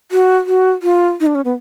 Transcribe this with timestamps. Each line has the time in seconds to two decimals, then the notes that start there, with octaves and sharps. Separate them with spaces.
0.12 F#4
0.46 F#4
0.83 F4
1.20 D#4
1.27 D4
1.35 C#4
1.45 B3